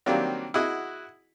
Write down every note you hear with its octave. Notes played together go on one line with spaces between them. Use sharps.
D#3 F#3 G3 A#3 C4 D4
E4 F#4 G#4 D#5 F#5